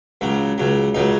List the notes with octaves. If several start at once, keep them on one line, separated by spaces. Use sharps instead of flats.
C#2 C#3 F#3
C#2 C#3 F#3
C#2 C#3 F#3 D#4